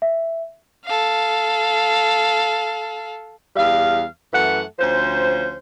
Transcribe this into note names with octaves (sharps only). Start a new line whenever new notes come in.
E5
A4 F5
E2 G3 F5
F#2 E3 A3 F#5
D2 F3 C#4 C5